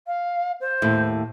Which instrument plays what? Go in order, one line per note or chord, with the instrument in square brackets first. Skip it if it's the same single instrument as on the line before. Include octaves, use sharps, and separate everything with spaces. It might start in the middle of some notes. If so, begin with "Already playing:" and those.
[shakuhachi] F5
C5
[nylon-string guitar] D#2 A2